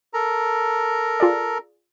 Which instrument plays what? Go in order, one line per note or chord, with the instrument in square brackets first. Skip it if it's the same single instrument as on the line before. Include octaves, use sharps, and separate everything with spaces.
[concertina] A4 A#4 A#5
[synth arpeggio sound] F4 G#4 D5